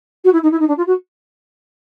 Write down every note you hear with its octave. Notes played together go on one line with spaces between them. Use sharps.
F#4
E4
D#4
E4
D#4
D4
F4
F#4